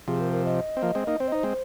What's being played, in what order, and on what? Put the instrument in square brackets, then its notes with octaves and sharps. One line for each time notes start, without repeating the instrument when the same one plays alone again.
[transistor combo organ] C3 F3 [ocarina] G#4
[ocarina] A#4
A#4
D#5
[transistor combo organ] C4
F3 A#3
G#3 C4
A#3 D#4
[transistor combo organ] C4 [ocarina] C5
[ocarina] D#5
[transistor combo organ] D#4 [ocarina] C5
[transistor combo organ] G#3 C4